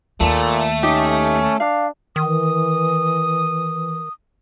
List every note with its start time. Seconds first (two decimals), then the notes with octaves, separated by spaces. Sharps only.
0.20 D#2 A#2 A3 A4
0.83 C#4 D#4 G4
1.60 D4 F5
2.16 D#3 E3 D#6